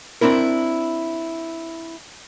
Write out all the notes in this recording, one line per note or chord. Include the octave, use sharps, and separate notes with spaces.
C4 D4 E4 A#4